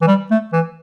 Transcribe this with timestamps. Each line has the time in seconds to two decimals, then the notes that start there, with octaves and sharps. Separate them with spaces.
0.01 E3
0.07 G3
0.31 A3
0.53 E3